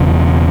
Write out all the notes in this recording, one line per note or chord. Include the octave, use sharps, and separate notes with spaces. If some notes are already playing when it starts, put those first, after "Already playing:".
Already playing: E1 E2 C#3